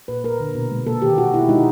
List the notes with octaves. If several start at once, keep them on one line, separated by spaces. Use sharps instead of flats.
A#2 B4
A#3 A#4
D3
B2
G#3
A#3 A4
D#3 G4
A#3 F#4
B2 E4
G#3 D#4